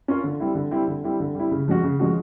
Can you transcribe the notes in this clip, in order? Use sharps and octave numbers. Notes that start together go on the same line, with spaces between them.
C#4 F4 A#4
D3
G3 C4 E4
D3
G3 C4 E4
D3
G3 C4 E4
D3
G3 C4 E4
C#3
F3 G#3 C#4 F#4
C#3
F3 G#3 C#4 F#4